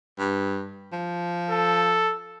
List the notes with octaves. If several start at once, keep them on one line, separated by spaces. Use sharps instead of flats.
G2
F3
A4